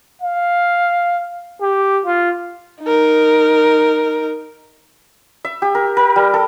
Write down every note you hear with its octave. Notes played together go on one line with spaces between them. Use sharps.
F5
G4
F4
D#4 A#4
E5
G4
A#4
A#4
G3
A4